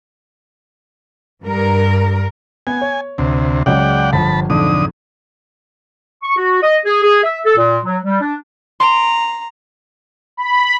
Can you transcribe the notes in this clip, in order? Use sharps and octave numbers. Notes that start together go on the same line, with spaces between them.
G2 A#4
B3 G#5
C#5
D2 C3
C#2 F#3 G#3 D5 F#5 G5
G1 F3 A5 B5
B1 F2 G#2 D3 D#6
C#6
F#4
D#5
G#4
G#4
E5
A4
A#2
F#3
G3
D4
A#5 C6 D7
B5